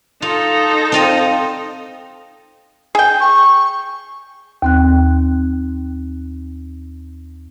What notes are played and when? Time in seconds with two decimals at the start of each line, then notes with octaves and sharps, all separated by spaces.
0.22 D#4 F4 A4
0.92 C4 F4 D#5
2.95 G#4 G5
3.20 C#6
4.62 D#2 C4 F#6